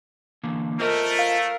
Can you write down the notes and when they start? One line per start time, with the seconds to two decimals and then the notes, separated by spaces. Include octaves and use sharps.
0.44 D3 E3 A#3
0.79 A3 F4 A#4 C5 D#5
1.19 F5